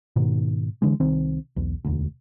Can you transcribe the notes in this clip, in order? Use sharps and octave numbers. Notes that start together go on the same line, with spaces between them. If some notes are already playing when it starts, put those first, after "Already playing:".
G#2 B2 D#3
D3 E3 G#3
C2 D#3 C4
B1 E2
E1 D2